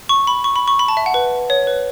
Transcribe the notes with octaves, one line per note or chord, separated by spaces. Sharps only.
C#6
B5
C#6
B5
C#6
B5
A5
E5
F#5
B4
C#5
B4